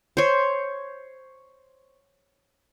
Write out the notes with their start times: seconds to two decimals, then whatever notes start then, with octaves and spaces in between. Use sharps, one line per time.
0.17 C5 C#5